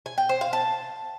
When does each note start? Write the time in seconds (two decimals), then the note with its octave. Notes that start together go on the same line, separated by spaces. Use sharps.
0.06 G#5
0.18 G5
0.29 C5
0.41 F5
0.53 A5